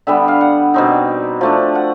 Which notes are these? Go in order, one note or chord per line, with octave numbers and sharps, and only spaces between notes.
D3 G3 B3 E5
F5
F#5
B2 G3 C4 D#4
F3 A3 D4
F#5